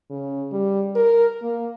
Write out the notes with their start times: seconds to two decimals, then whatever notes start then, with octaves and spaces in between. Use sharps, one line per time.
0.10 C#3
0.52 G3
0.96 A#4
1.43 A#3